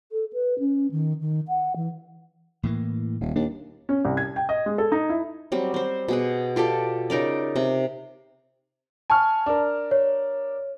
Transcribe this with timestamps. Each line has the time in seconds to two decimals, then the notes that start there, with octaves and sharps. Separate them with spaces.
0.12 A4
0.33 B4
0.59 C#4
0.92 D#3
1.21 D#3
1.48 F#5
1.76 E3
2.63 A2 E3 A#3
3.20 D#1
3.36 D#2 D4
3.89 C#4
4.05 C2
4.17 G#6
4.36 G5
4.49 D#5
4.66 G#3
4.78 A4
4.92 D#4
5.10 E4
5.52 F#3 G3 C4
5.74 C4 C5
6.08 B2 G#4 F#5
6.56 F4 G4 A4 D5
7.10 C#3 D#4 A#4 D5
7.56 C3
9.10 G#5 A5 C#6 F6
9.46 D4 A#4
9.91 C#5